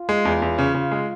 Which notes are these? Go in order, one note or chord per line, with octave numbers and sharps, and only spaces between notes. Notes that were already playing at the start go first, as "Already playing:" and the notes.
Already playing: F4
G#3
E2
E2
C#3
C#3
G#3